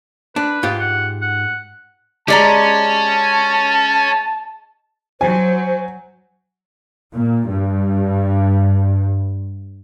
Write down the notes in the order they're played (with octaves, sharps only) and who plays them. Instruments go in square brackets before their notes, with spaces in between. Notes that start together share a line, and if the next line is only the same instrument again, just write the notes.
[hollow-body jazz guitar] D4 [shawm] B4
[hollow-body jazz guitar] G#2 F4 G4
[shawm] F#5
F#5
[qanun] G#3 [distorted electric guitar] C#4 [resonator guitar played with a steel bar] G4 D5 A#5 [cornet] A5
[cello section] F#3 [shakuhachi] C5 [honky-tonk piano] G#5
[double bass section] A#2
G2